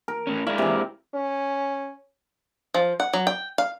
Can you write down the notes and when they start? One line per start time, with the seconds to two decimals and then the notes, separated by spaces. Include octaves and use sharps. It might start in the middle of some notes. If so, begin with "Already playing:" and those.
0.08 A#4
0.27 A2 C#4
0.47 G#3 E4 D5 F5
0.58 C3 E3
1.14 C#4
2.74 F3
3.00 F#5
3.13 F#3
3.27 G5
3.58 F5